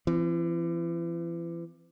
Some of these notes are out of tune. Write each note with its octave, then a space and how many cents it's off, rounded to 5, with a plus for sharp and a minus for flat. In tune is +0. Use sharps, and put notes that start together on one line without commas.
E3 +40 C4 -5